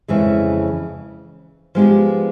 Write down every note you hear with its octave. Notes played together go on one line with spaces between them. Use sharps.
F2 C#3 E3 G#3
F3 G#3 B3 D#4 G4